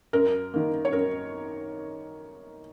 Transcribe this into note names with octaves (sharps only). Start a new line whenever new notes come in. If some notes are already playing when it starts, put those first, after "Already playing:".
F#2 A#4
D#3 A#3
C#5
F#2 A#4